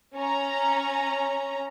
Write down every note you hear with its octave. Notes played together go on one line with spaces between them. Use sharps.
C#4 A#5